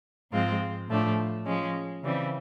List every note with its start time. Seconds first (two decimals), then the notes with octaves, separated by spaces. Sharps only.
0.31 G#2 F3 G#3 C4 F4
0.89 A2 F3 A3 D4
1.46 F3 G#3 C#4
2.03 C#3 E3 G3 C4